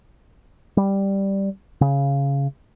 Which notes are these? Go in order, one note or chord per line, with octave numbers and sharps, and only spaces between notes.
G3
C#3